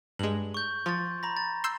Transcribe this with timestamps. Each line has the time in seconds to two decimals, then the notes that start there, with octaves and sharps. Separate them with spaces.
0.19 G2 G#3 F#7
0.54 C#6 G6
0.86 F3 C6 A6
1.23 A#5 B5 A#6
1.37 A6
1.64 C6 E6 G6